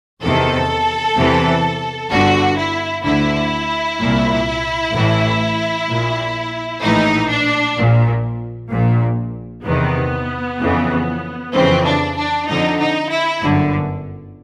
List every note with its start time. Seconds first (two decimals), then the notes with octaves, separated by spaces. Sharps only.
0.21 E2 C3 D#3 A4
1.16 E2 C3 E3
2.10 G1 G2 D3 F#4
2.57 E4
3.04 D2 D3 E4
3.99 C2 A#2
4.93 A1 A2 E3
5.87 A#1 A#2
6.82 A#1 A2 E3 D#4
7.29 D4
7.77 A#1 A#2
8.70 A#1 A#2
9.64 E2 C3 D#3 B3
10.59 F2 C#3 E3
11.53 F2 C#3 E3 C4
11.85 D4
12.17 D4
12.47 F2 D3 D#4
12.80 D#4
13.10 E4
13.42 G1 F#2 D3